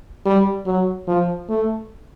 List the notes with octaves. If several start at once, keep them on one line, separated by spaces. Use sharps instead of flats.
G3
F#3
F3
A3